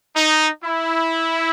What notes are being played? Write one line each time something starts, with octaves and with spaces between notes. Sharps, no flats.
D#4
E4